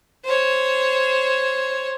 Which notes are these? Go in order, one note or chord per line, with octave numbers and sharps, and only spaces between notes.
C5 C#5